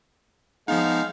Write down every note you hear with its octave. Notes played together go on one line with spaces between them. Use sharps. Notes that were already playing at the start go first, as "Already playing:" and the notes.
F3 G#3 B3 D#4 F5